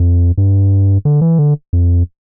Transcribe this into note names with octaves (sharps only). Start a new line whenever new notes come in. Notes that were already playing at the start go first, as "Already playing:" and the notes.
Already playing: F2
G2
D3
E3
D3
F2